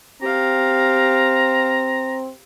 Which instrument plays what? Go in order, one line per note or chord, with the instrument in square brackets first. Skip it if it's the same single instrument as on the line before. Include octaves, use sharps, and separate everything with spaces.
[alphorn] C4 [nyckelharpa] G4 F5 [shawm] A#5